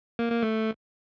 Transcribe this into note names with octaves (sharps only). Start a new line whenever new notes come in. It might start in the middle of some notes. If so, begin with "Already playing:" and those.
A#3
A#3
A3